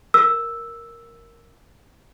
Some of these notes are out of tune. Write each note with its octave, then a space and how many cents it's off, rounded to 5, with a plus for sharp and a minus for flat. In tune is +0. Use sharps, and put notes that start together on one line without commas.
A#4 +0 E6 +0